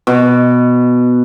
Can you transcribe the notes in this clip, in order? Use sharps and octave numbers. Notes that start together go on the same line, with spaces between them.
B2